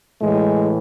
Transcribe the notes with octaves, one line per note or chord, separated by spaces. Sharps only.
A2 E3 G#3